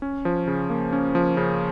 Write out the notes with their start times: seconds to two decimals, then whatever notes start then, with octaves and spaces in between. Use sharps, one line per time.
0.02 C#4
0.25 F3
0.48 C#3
0.70 A#3
0.93 C#4
1.15 F3
1.37 C#3